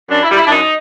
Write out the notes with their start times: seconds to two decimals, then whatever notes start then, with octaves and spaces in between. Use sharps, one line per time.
0.09 F#2 D4
0.23 E4
0.30 D#3 G3
0.37 E4
0.47 D4
0.51 F#2 D#4